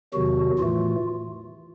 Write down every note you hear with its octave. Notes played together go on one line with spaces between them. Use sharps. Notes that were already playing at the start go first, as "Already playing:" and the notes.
E2 C3 D#3 F#3 F#4
A2 E3 A3 F4